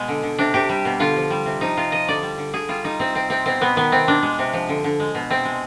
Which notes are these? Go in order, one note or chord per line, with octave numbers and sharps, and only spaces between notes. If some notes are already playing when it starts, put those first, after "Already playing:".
Already playing: B2 G#3
D3
D3
C3 D4
C3 G4
G3
B2
D3 F4
F3
G3
C3
F3 D#4
C3 F4
F3 D#5
D3 D5
G3
D3
D3 G#4
G3 F4
G3 D#4
C3 C4
C3 C4
C3 C4
B2 C4
B2 B3
D#3 B3
C3 C4
B2 D4
G#3
C3
F3
D3
D3
G#3
B2
C3 C4
G#3